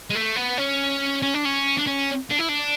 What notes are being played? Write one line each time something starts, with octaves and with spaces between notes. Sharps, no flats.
G#3
A3
B3
C#4
C#4
D4
C#4
D4
C#4
D4
E4
D4